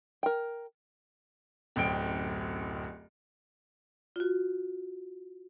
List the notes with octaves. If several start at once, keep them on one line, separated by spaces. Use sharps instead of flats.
A#4 G5
D1 A1 F#2 G5 D7
F4 F#4